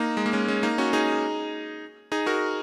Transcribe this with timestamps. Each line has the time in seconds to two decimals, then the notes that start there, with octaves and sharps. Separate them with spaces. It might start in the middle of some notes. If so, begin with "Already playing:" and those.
Already playing: A#3 D#4
0.17 G#3
0.26 A#3
0.33 G#3 C#4
0.48 G#3 C#4
0.63 A#3 D#4
0.78 C#4 F#4
0.93 D#4 G#4
2.12 D#4 G#4
2.26 F#4 A#4